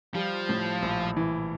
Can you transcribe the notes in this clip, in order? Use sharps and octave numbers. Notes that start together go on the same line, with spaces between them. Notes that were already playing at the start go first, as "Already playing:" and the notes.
F3 G3
A2
A#1
E3